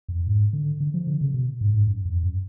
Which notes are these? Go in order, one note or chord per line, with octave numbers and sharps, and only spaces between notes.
F2
G#2
D3
D3
F3
D3
C#3
B2
G#2
G#2
F#2
F2
F#2